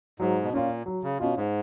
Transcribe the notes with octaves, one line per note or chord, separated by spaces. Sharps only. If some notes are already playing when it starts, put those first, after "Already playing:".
G#2 F#3
B2
A#2 C#4 F4
F#3
C#3
B2 C#4 F4
G#2